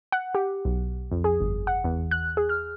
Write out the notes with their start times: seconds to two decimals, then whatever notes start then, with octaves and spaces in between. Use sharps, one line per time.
0.12 F#5
0.35 G4
0.65 B1
1.12 F2
1.24 G#4
1.41 G1
1.67 F#5
1.84 E2
2.11 F#6
2.37 G#4
2.49 F6